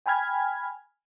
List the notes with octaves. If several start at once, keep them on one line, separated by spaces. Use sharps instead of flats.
G5 G#5 B5 F6 G#6